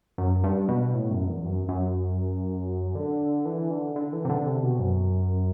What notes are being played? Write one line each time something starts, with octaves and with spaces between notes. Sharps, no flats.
F#2
G2
B2
A2
F#2
E2
F#2
F#2
D3
E3
D3
D3
E3
C3
D3
C3
B2
F#2